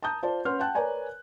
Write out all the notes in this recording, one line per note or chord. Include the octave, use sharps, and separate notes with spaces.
A5 A#5 D#6 G6
F4 C5 D5 A5
C#4 B4 F#5 C6 F6
F#5 G5 A5 F#6
A#4 B4 C#5 D5 G#5 A#5